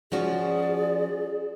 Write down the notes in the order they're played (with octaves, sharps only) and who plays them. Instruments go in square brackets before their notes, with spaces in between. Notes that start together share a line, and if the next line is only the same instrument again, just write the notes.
[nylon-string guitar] F3 C#4 F#4 [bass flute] G#4 [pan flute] D5